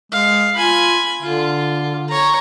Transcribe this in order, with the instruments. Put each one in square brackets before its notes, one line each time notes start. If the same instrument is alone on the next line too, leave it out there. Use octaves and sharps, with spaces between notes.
[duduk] G#3 [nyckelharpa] F5
[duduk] F4 [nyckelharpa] G#5 B5
[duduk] D3 [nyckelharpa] F4
[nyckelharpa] C#5 A#5